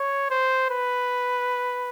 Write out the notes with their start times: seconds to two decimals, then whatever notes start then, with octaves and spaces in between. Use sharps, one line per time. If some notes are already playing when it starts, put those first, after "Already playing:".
Already playing: C#5
0.31 C5
0.71 B4